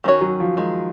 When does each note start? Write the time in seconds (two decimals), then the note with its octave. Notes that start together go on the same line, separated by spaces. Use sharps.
0.04 D#3 G#3 C#4 F#4 C#5
0.21 F#3
0.40 F3
0.57 D#3 G#3